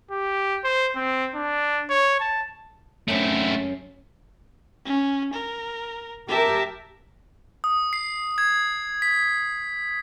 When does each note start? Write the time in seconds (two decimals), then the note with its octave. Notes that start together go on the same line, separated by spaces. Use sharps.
0.11 G4
0.64 C5
0.95 C4
1.35 D4
1.89 C#5
2.20 A5
3.08 F#2 A3 C4 C#4
4.85 C#4
5.33 A#4
6.28 G4 A#4 E5 A5
7.64 D#6
7.93 C7
8.38 G#6
9.02 B6